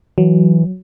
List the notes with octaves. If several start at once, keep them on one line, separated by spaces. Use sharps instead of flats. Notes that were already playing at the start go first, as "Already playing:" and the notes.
E3 F#3